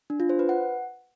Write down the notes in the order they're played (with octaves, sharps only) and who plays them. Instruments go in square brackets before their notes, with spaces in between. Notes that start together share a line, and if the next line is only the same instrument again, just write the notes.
[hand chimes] D4
F4
C5
B4
F#5